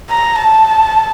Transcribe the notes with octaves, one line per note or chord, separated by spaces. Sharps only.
A#5
A5